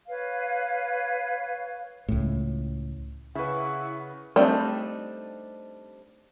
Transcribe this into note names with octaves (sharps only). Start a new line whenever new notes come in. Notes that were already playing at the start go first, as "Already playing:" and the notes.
B4 C#5 F5
C#2 A2
C#3 E4 B4 F#5 C#6
G3 A3 C4 D4 D#4